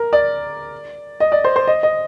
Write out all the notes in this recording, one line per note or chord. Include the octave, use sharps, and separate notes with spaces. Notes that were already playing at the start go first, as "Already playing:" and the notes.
Already playing: A#4
D5
D#5
D5
C5
C5
D#5
D#5